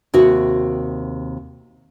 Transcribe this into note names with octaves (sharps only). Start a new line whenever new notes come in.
D#2 C3 F#4 F#5